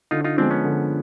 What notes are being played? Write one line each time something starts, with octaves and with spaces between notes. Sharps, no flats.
D3 D#4 F4
D#4 F4
F3 G#3 B3 C4 D4
B3 C#4
D3